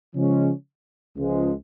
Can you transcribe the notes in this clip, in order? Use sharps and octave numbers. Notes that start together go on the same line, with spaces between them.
C#3 F3 G#3 C#4
C#2 C#3 F3 G#3